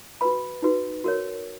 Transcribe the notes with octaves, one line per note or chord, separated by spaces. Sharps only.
F#4 B4 B5
D#4 F#4 B4
F#4 A#4 C#5